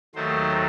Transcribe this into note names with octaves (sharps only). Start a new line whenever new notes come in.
D#2 D#3 F#3 A3 C5